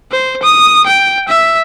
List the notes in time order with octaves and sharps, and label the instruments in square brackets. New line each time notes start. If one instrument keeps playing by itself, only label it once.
[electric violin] C5
D#6
G5
E5